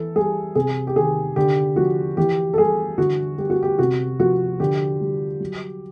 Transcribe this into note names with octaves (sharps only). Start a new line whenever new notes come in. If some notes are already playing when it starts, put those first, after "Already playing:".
Already playing: E3 A4
G3 G#4
C3 G#4
G4
D#3 G#4
D3 G4
F3 F#4
E3 G4
A4
G3 G#4
D3 F#4
G3 G4
F#4
G4
C3 F#4
F3 F#4
D3 G4
G3
F#3